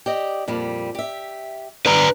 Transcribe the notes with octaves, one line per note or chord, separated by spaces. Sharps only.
G4 D5 D#5
F2 A#2 G3
G4 E5
G2 B4 D5 A#5